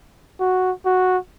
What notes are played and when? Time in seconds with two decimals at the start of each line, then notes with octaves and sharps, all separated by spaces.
0.40 F#4
0.85 F#4